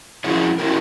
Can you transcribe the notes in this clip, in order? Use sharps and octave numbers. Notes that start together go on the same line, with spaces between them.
F3 C#4 E4 F#4 G#4 C#5
C#4 E4 F#4 G4 A#4